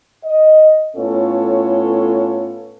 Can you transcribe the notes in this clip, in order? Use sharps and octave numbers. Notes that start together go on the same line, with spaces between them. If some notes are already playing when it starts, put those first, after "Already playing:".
D#5
A2 B3 C#4 F4 A4 C#5